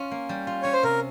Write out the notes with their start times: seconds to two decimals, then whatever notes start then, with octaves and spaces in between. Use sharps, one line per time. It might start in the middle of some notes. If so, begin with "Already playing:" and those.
Already playing: C#4 F4
0.11 A#3
0.29 G3
0.47 F4
0.62 C#4 C#5
0.73 C5
0.83 C3 A#4